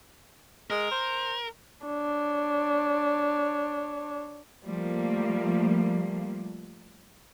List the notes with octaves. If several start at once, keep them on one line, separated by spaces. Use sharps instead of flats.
G#3 A#4
C5
D4 C#5
F3 G3 A3 A#3